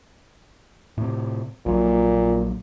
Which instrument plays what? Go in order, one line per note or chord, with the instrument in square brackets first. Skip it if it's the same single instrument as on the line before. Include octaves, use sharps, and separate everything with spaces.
[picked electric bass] A2 C3
[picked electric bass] A#1 F#3 [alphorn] A#2